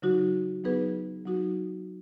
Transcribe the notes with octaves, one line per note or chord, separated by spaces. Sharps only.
C#3 F#3 D#4 F#4
F#3 B3 D#4 G#4 B4
F#3 D#4 F#4